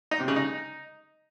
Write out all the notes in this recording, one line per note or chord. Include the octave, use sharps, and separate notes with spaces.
D#4
C3
C#3
D#4